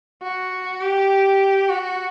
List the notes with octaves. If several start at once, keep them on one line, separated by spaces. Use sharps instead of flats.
F#4
G4
F#4